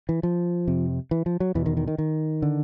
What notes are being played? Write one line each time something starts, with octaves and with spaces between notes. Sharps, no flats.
E3
F3
F2 C3
E3
F3
F#3
E2 B2 E3
D#3
D#3
D#3
D#3
D3